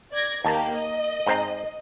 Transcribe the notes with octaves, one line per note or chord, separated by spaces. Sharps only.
D5 G#6 A#6
D#2 A#3 G4 A5 A#5
D#5
G#2 C4 A#5